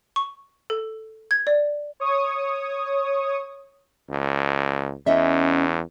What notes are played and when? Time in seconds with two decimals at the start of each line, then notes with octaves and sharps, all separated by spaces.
0.16 C#6
0.70 A4
1.31 G#6
1.47 D5
2.00 C#5 C#6 D#6
4.10 C#2
5.07 E2 C#4 D#5 E5